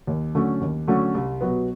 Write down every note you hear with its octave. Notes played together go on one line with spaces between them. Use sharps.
D#2
D3 F#3 A3 C#4
D#2
D3 F#3 A3 C#4
C2
B2 F#3 B3